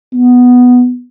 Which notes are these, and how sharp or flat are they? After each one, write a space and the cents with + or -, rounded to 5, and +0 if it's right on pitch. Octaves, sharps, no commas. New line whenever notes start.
B3 +0